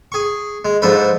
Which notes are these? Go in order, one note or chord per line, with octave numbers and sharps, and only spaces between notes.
G#4 C#6
G#3
G#2 F3 D4 A4 B4